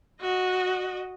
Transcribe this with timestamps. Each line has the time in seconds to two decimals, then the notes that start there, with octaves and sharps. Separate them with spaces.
0.21 F#4 D#5